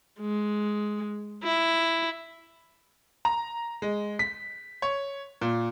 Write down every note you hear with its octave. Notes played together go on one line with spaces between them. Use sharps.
G#3
E4
A#5
G#3
B6
C#5
A#2